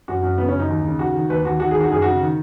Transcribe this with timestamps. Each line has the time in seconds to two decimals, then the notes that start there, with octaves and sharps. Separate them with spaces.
0.08 F#2 F#4
0.23 F#2
0.38 C#3 B3
0.48 C#4
0.54 F#2
0.59 D#4
0.68 D#2
0.85 C#3
0.99 D#3 F#4
1.15 D#3
1.29 D#2 B4
1.45 D#2 F#4
1.60 D#3 F#4
1.71 G#4
1.76 D#3 F#4
1.90 F#2 G#4
2.02 C#3 F#4
2.21 D#3